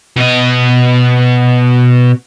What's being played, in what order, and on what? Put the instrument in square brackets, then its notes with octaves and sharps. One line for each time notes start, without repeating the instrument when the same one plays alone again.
[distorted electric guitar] B2 D#5